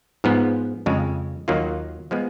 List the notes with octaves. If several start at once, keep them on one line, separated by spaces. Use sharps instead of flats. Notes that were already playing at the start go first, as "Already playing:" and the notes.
G#2 F3 B3
F2 C#3 G#3
D#2 D#3 F#3 A#3 F4
F3 G#3 B3